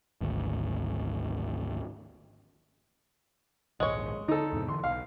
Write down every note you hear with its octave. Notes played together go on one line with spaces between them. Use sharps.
G#1 D2
A#1 D#2 G#2 G#3 C#5
D3 D#4 A4
E2 G#2 C3
D3 E3 C6
B1 F5